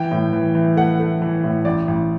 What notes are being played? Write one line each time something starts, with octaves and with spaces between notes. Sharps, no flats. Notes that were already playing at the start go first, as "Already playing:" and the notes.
Already playing: E3 G5
A2
E3
E3
A3 F#5
A3
E3
A2
A1 D5
A1